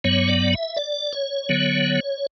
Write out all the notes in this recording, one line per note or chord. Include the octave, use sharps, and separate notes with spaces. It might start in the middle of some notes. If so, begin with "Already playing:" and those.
G2 F#3 B3 C#5
D5
E5
D5
C#5
D3 F#3 B3